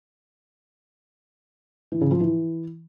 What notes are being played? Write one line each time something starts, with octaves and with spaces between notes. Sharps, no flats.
E3
C#3
F3
E3